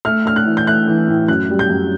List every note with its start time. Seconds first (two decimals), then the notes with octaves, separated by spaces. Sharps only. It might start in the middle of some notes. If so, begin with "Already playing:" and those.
0.05 A3 F6
0.25 A3 F6
0.36 F#6
0.46 E3
0.57 G6
0.67 A3 F#6
0.87 E3
1.08 A2
1.28 F#2 F#6
1.49 G3
1.59 G6
1.70 F#2